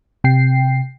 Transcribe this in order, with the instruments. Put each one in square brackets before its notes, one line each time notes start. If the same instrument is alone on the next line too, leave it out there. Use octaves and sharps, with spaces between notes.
[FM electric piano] C3 G5 C7